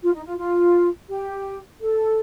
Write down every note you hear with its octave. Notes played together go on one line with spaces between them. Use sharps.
F4
D#4
F4
F4
G4
A4